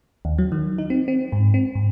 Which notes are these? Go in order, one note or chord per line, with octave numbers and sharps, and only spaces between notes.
D#2
F#3
D#3
D#4
C4
C4
G#2
C4
G#2